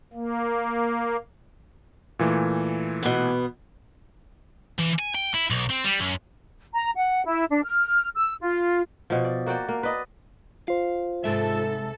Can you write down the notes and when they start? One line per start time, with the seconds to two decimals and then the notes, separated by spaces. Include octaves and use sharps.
0.13 A#3
2.19 A#2 E3 A3
3.03 B2 B3
4.79 E3
4.99 G#5
5.15 G5
5.34 E4
5.50 B1
5.70 C4
5.84 G3
6.00 F#2
6.73 A#5
6.95 F#5
7.25 E4
7.50 D4
7.64 F6
8.16 E6
8.41 F4
9.10 B2 F3
9.25 D5
9.46 A#3 F#4 D5 G5
9.69 A#3
9.83 B4 D5 D#5
10.68 F4 C5 F5
11.24 G#2 C3 G#3 A4 E5